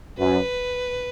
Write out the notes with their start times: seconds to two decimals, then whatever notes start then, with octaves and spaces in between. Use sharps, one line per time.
0.18 F#2 B4